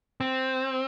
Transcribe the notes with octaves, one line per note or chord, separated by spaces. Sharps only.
C4